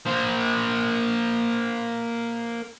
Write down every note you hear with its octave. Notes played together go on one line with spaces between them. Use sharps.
A#3 C5